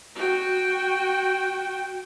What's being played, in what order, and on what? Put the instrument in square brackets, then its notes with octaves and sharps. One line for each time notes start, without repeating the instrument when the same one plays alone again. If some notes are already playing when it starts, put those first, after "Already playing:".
[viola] F#4 G5